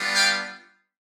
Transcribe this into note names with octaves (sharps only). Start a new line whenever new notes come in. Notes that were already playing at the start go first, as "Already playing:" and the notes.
Already playing: G3 B3 D4 F4
F5 G5